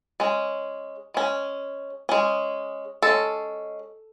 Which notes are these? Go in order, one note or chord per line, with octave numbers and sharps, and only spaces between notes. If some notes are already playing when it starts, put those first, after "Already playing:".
G#3 C#4
G#3 C#4
G#3 C#4
G#3 C#4 A4